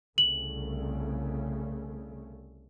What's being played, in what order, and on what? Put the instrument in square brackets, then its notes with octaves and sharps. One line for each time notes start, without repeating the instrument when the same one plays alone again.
[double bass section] C2 C#3 A3 [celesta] F#7